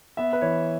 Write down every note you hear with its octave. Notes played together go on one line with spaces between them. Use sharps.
B3 E5
B4
E3 C#5